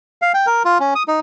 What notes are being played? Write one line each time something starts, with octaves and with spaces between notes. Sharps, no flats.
F5
G5
A#4
F4
C#4
D#6
D#4